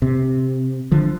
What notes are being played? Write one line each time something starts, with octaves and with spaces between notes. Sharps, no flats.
C3
D3 F3